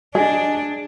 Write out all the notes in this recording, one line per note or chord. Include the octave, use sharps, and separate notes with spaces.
D4 G#4 D#5